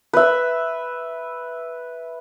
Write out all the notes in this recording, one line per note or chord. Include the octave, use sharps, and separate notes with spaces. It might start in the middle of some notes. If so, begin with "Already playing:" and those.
B4 E5